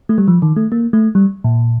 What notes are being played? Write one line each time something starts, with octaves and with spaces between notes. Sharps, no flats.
A3
G3
F3
D#3
A3
A#3
A3
G3
A#2